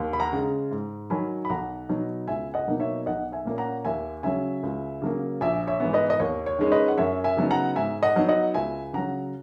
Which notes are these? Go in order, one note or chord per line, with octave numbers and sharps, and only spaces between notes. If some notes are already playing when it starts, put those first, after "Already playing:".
Already playing: D#2
B5
F#5 A#5
C#3 G#3
G#2
D#3 F#3 G#5 B5
B5
B1 F#5 A#5
B2 F#3 B3 D#4
C#2 E5 G#5
D#5 F#5
B2 F#3 A#3 D#4
C#5 E5
B1 D#5 F#5
E5 G#5
A#2 A#3 C#4
F#5 A#5
D#2 E5 G#5
C#3 F#3 C#4 E5 G#5
C#2
C#3 F#3 A#3
A#1 E5 G#5
C#5 E5
G#2 E3 B3
B4 D#5
D#5
D#2 C#5
C#5
D#3 G#3 C#4
B4 D#5
F#5
F#2 C#5 E5
E5 G#5
C#3 F#3 B3 D#4
F#5 A#5
G#2 E5 G#5
D#5 F#5
F#3 B3 D#4
D#5 F#5
C#2 E5 G#5
C#3 F#3 F#5 A#5